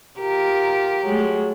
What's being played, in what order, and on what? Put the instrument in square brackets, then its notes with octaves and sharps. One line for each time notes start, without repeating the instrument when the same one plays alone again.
[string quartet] F4 A#4 [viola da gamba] G4
[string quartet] F#3 G#3 A3